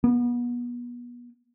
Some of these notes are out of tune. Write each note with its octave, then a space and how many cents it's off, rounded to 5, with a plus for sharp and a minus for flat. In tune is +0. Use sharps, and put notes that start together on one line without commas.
B3 -30